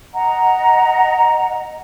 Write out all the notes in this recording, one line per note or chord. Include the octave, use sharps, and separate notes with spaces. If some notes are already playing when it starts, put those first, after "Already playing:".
D#5 F#5 A#5